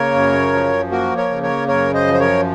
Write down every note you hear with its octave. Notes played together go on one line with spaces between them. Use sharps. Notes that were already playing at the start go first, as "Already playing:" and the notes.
Already playing: C#3 A#3 A#4 C#5
F#2
F3
A#3 F#4 A#4
A#4 C#5
C#3
A#4 C#5
F#2 A#4 C#5
C5 D#5
F3
C5
A#4 C#5